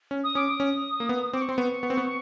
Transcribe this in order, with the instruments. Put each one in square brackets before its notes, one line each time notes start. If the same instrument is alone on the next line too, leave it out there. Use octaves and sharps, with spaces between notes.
[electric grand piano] C#4
[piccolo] D#6
[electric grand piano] C#4 [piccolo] D6
[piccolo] D#6
[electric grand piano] C#4
A#3
B3
[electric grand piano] C4 [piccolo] D6
[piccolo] C#6
[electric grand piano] C4 [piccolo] C6
[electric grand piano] B3 [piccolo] C#6
[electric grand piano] B3
C4
B3